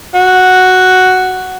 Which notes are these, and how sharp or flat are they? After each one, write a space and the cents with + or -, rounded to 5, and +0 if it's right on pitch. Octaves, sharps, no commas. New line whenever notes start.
F#4 +0